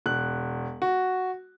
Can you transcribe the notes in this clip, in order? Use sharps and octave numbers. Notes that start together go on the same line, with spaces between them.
E1 F#6
F#4